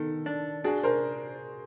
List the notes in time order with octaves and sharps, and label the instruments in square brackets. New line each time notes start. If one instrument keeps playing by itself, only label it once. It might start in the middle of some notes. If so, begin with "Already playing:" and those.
Already playing: [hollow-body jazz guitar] D#3 B3 [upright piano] A4
[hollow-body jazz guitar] D4
[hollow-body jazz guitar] D4 [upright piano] F#4 G#4
[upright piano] A#4 C5